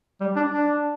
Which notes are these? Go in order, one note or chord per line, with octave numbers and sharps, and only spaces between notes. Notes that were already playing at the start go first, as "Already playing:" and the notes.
G3
D4
D4